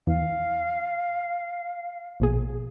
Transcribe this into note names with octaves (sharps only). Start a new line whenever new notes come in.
E2 F5
A#1 B2 G#4